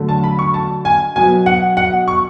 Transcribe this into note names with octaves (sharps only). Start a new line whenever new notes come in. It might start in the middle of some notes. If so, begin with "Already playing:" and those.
Already playing: D3 F#3 A3
A5
B5
C#6
A5
G#5
B2 F#3 B3 G#5
F#5
F#5
C#6